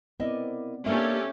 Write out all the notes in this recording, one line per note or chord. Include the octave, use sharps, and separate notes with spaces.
B3 C4 E4 A#4 D5 D#5
A#3 C#4 D4 G4 A4 A#4 E5